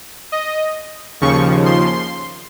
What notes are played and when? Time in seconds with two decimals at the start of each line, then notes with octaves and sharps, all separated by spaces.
0.32 D#5
1.21 D#2 C#3 F3 C#6
1.66 C6